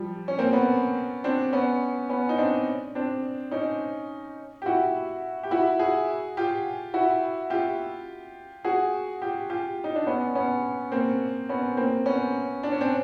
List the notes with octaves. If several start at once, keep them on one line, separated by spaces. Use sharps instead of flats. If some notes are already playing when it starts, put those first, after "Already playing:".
Already playing: F3 G3
C#4
A#3 C4
B3 C#4
C4 D4
B3 C#4
B3 C#4
D#4
C4 D4
C4 D4
C#4 D#4
G4
E4 F#4
G4
E4 F#4
F#4 G#4
F4 G4
E4 F#4
F4 G4
F#4 G#4
F4 G4
F4 G4
D#4
D4
B3 C#4
B3 C#4
A#3 C4
B3 C#4
A#3 C4
B3 C#4
D4
C#4
C4 D4